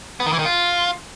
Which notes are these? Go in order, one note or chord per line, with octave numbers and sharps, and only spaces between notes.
B3
D#3
E3
D#3
F4